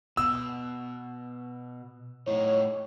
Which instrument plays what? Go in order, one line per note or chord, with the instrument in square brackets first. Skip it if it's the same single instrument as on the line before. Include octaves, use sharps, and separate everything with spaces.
[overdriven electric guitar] B2 [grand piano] E6
[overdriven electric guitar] A2 D#4 [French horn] C#5